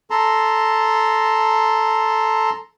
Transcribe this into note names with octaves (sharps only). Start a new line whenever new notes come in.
A4 A5 A#5 C6